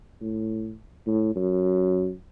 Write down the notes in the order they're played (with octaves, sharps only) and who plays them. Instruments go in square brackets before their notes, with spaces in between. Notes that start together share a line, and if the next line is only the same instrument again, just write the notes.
[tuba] A2
A2
F#2